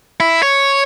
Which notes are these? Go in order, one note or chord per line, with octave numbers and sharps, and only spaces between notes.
E4
C#5